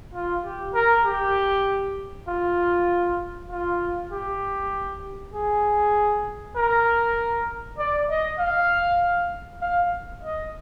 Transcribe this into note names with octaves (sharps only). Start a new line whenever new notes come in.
F4
G4
A#4
G4
F4
F4
G4
G#4
A#4
D5
D#5
F5
F5
D#5